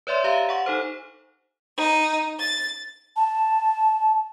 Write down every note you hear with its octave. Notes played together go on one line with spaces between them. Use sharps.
B4 C#5 D5 E5 C6
G4 E5 F5 A#5
F#5 C#6
D#4 A4 C5
D#4
A6
A5